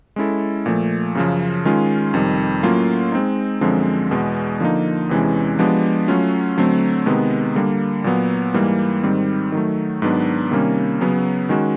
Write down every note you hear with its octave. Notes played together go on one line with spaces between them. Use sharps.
G#3 C#4 E4 A4
A#2 F3 A3
F#2 C#3 F3
D#3 G#3 C#4 F4
F2 C3 D#3 G3
A2 F#3 A#3 C#4 F4
G#3 C4 D#4
F#2 D3 F3 G#3 C4
E2 B2 G#3 B3
D3 F3 A#3 D#4
E2 C3 E3 G#3 C#4
F3 G#3 B3 D4 G4
F#3 A3 C#4 F4
D3 F#3 A3 C4
C3 D#3 G#3 B3
D3 G3 A#3
A#2 F#3 B3
G#2 E3 G3 A#3
G#2 D#3 G3 C4
D#3 F#3 A3
G#2 D#3 F#3 B3 D4
C3 D#3 G3 A#3 C#4
C#3 F#3 B3
D#3 G#3 C#4 F#4